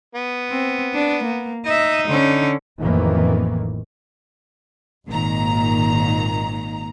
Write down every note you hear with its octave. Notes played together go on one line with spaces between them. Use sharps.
B3
C4
D4
A#3
D#4 D#5 E5
D3 C#4
A1 F2 D#3 E3 A#3
G#1 A#2 D#3 A#5